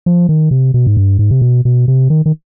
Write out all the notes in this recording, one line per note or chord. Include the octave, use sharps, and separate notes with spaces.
F3
D#3
C3
B2
G#2
G2
G#2
C3
B2
B2
C3
D#3
D#3